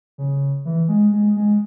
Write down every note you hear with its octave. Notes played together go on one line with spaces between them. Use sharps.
C#3
E3
G#3
G#3
G#3